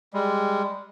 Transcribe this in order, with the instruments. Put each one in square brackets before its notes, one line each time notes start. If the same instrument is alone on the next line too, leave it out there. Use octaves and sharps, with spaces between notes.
[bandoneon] G3 G#3